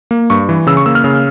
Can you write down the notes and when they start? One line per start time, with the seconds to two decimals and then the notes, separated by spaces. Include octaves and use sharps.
0.11 A#3
0.30 G2 C#6
0.49 E3
0.67 C#3 E6
0.77 C#6
0.86 A#3 E6
0.95 F6
1.04 C#3